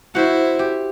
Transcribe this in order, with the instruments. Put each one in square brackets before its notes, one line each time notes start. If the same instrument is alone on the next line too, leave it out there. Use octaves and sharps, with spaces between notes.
[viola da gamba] E4 [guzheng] F#4 C5
[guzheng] G4